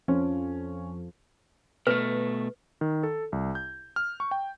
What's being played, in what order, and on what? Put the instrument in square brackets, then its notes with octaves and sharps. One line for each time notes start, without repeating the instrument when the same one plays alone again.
[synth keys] F2 [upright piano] C#4
[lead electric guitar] B2 A3 [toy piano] B4
[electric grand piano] D#3
A4
C2
G6
F6
C#6
G5